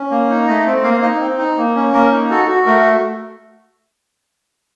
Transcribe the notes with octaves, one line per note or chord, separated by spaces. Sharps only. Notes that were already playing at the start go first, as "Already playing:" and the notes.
Already playing: C#4
A#3
D#4
A3 D#5
C4
A#3 F5
F5
D#4 D#5
C4
D#4
A#3
C#4
A#3 A#4
D#4
F#4 A4
F#4
A3 A#4